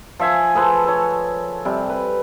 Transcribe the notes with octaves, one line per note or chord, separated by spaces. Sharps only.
F3 E5 G#5
G#4 A4 B4 C5
A4 C#5
C3 G3
B4